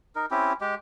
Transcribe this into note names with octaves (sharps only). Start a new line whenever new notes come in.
D#4 A#4
C4 C#4 E4 G4
G#3 G4